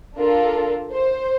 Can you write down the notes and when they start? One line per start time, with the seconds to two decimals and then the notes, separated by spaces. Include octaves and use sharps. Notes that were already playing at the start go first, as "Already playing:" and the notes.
0.16 D4 F4 A4 A#4
0.91 C5